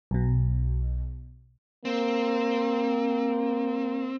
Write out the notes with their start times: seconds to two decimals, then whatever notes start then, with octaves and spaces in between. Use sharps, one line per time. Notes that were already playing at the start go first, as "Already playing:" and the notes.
0.11 B1 B2
1.85 A#3 C4